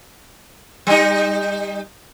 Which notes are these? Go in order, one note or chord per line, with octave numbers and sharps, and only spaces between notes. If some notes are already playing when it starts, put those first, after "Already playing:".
G3 D#4